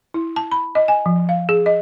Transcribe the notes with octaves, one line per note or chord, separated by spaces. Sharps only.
E4
A5
B5
D#5
G#5
F3
F5
G#4
D#5